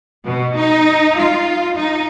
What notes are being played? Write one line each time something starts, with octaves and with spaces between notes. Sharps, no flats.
B2
D#4
F4
D#4